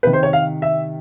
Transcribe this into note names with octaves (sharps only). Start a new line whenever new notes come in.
C3 D#3 B4
C5
C#5
F5
E5